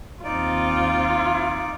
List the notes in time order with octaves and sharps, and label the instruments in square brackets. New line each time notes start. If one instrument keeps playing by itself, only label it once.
[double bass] D#2 C4 [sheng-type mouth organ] D#4 D5 [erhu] F4